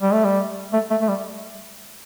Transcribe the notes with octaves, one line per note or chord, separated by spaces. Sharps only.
G3
A3
G3
A3
A3
A3
G3